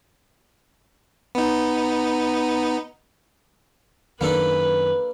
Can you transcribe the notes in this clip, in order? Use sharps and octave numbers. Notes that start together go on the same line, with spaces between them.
B3 D#4
F#2 D#3 A#3 D4 A4 B4